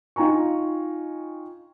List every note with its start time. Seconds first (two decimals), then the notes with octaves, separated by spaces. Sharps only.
0.16 D#4 F4 G5 G#5 A#5 C#6